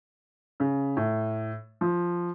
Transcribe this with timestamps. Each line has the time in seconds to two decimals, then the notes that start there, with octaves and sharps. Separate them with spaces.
0.60 C#3
0.97 A2
1.81 F3